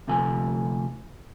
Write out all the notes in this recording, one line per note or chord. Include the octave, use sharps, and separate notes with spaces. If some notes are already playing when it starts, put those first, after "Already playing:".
D2 C3 F3 A3 G#5